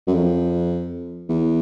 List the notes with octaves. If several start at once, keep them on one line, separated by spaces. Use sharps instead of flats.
F#2
F2
E2